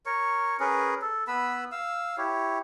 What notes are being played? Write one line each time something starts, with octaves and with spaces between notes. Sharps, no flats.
A#4 C#5 C#6
C#4 G#4 A#4 B4
A4
B3 B4 B5 E6
F5 E6
E4 G4 C#5